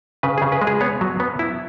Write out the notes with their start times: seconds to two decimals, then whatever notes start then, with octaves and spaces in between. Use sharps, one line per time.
0.23 C#3 B4
0.38 G#4
0.42 C#3
0.52 B4
0.61 G#3
0.67 G#4
0.81 B3 C#5
1.01 F#3
1.20 B3
1.39 E4